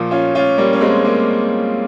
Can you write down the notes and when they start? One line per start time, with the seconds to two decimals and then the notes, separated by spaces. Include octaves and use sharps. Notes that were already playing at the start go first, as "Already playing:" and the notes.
Already playing: A#2 F3
0.11 C#4 F4
0.35 C#4 F4
0.58 G3 A#3
0.73 C#4
0.80 G#3 C4
1.05 A#3 C#4